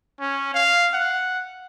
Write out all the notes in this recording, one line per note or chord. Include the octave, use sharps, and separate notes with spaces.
C#4
F5
F#5